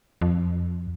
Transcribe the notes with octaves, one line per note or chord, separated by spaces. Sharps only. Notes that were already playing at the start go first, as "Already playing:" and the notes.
F2